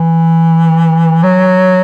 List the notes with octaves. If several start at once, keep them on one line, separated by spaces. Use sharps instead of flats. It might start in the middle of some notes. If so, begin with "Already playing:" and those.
Already playing: E3
F#3